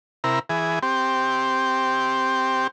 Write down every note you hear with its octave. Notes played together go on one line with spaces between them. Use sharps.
C3 E4 A#4
E3 G#4
C4 G4